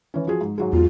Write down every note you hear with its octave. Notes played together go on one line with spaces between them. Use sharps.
E3 C#4
F3 F#4 G#4
G#2
G#2 F#3 G#3
E2 F4